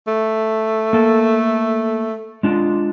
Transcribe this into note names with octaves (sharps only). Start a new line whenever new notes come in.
A3
A#3 A4
G#3 D4 F4